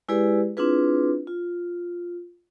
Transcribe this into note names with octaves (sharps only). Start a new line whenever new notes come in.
G#3 E4 G4 G#4 B4 D5
C4 D4 E4 F4 G#4 B4
F4